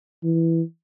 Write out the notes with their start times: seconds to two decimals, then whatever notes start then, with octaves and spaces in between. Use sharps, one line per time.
0.23 E3